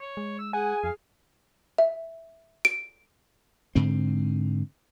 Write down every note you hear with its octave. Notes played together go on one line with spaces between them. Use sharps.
C#5
G#3
E6
G#4 F#5 G#5
F2 F5
E5
D7
G#2 D3 C4